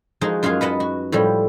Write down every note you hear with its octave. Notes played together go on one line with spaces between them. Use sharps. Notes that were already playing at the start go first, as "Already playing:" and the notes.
F3 G#3 D#4 F#4
F#2 F4 F#4 G#4 F5
B4 D#5 F#5 A5
F#4
A2 F3 G3